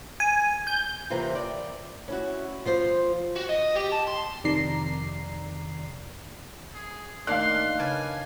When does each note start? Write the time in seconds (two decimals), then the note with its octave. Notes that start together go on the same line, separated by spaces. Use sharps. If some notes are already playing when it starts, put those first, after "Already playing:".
0.20 G#5
0.67 G6
1.10 C3 E3 A#3 C4 F4
1.35 D5
2.08 C#4 E4 F#4
2.65 F3 F4 C5
3.36 F#4
3.49 D#5
3.76 G4
3.92 A5
4.07 C6
4.44 F2 C3 D#3 D5 A#5 C7
6.74 G#4
7.27 D#3 A3 A#3 D4 D5 F5 C6 F#6
7.79 C#3 B4 D5 G#5 A5